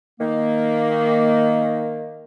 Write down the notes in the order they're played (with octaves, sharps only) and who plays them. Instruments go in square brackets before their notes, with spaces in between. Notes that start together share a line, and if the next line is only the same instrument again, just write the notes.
[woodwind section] D#3 A#3